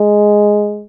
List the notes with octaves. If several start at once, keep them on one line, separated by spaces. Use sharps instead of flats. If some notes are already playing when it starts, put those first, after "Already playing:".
Already playing: G#3